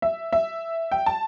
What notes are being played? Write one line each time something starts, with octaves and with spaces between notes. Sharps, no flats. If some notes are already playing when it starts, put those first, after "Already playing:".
E5
E5
G5
A5